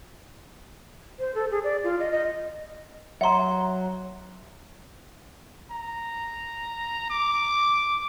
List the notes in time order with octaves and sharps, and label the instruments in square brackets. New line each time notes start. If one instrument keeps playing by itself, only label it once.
[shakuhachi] C5
A4
G#4
D5
F4
D#5
D#5
[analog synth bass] F#3 [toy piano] E5 A#5 [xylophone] F#5 C6
[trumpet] A#5
D6